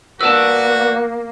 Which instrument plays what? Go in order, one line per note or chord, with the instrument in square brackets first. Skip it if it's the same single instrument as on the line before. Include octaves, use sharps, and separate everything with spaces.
[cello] A#3 [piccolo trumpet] F#4 [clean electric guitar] B4 D5 A5 [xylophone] E6